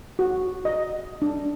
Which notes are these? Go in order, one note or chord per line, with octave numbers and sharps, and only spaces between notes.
F#4
D#5
D4